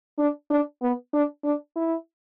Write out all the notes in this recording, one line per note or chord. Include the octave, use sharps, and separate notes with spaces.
D4
D4
B3
D4
D4
E4